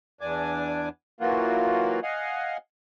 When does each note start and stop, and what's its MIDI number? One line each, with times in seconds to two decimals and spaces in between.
0.21 0.89 40
0.21 0.89 62
0.21 0.89 80
0.21 0.89 86
1.20 2.00 52
1.20 2.00 54
1.20 2.00 58
1.20 2.00 65
1.20 2.00 66
2.03 2.57 75
2.03 2.57 77
2.03 2.57 78
2.03 2.57 80